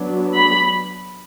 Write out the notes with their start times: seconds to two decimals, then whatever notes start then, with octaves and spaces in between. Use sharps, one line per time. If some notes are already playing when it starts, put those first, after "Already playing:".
Already playing: F#3 B3 D4
0.35 B5